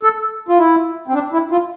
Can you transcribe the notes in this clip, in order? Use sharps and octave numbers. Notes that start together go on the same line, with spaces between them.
A4
F4
E4
C4
D4
E4
F4